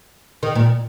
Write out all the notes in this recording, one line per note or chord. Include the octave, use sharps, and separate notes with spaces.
D#3
A#2